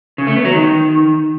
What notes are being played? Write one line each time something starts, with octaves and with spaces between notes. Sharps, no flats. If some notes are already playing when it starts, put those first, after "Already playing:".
C#3
A3
B3
F#3
D#3